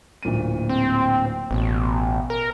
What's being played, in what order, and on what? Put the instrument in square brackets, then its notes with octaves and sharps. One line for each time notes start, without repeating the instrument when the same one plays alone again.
[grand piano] D1 A#2 D#7
[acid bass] C4
[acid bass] A1 [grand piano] B2
[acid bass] A#4